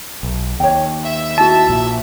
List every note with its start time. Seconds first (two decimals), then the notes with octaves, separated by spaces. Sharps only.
0.23 B1
0.60 D#2 C#5 G5
1.04 E5
1.38 E4 F#4 A5
1.69 A#1 A#2